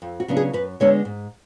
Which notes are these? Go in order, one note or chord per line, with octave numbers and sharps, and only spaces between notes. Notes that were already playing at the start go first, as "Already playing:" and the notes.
F2
F#4
C#3 F#3 B3 D4
G#4
F#2 B4
D3 G#3 B3 D4 C#5
G#2